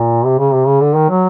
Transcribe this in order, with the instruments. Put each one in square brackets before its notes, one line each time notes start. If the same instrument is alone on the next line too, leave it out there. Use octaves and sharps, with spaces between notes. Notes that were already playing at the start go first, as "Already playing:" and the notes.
Already playing: [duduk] A#2
C3
C#3
C3
C#3
D3
D#3
F#3